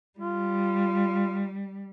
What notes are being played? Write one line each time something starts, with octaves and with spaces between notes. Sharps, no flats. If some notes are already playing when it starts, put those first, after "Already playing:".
G3 F4